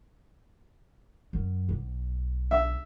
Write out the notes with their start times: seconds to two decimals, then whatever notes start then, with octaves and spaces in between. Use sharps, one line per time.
1.33 F#2
1.69 B1
2.51 E5